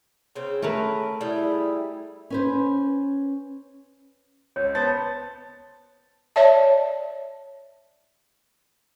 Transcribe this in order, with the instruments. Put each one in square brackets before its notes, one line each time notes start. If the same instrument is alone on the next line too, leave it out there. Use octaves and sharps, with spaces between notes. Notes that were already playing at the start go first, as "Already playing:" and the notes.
[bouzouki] C#3 C4 C#4
[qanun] A3 A#4 B4
[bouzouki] G3 G#4 [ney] E4
[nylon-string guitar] C#4 B4 C5
[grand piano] C#2 [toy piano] C#5
[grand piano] B3 C5 A6 [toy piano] A5
[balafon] C#5 D5 E5 A5